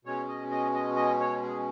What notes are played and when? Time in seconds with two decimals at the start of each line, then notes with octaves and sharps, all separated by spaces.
0.05 B2 G#3 C#4 C#5
0.28 D#5
0.51 D#5
0.74 D#5
0.96 D#5
1.20 C#5
1.42 G#4